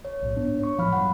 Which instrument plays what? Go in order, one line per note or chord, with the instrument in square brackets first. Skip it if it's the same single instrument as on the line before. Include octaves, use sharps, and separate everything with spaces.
[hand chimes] C#5
[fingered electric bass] B1 A2
G#2 B3 D4
[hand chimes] C#5 C#6
[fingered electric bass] A2 F3 [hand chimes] F5 B5 F6
[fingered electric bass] G2 F#3 [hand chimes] F#5